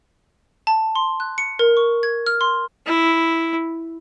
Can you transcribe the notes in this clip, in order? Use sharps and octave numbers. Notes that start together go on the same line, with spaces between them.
A5
C6
F#6
C#7
A#4
C#6
G#6
F6
C6
E4